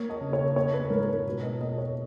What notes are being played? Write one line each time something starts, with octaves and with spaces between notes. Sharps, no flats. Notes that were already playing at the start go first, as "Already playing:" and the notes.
Already playing: A#3 C#5
D#5
C#3
C#5
A#3 C#5
B4
G#2 A#4
A#4
B4
B2
D#5
A#3 D#5
C#5